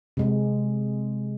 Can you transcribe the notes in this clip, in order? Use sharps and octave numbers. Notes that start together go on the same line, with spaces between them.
C3 G#3